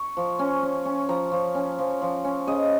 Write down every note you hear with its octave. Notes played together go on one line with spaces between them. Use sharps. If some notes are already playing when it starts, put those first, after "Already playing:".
Already playing: C#6
F3
C#4
C#4
C#4
F3 A#5
F3
C#4
F3
F3
C#4
C#3 D#5